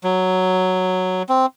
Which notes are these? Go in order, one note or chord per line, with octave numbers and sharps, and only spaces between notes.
F#3
C4